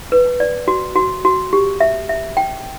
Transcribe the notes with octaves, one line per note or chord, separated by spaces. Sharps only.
B4
D5
F#4
F#4
F#4
G4
E5
E5
G5